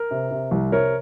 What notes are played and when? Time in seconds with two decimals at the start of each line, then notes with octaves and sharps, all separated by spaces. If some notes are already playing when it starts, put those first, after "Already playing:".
Already playing: A#4
0.11 C3
0.31 C3
0.51 C2
0.72 C3 A#4 C#5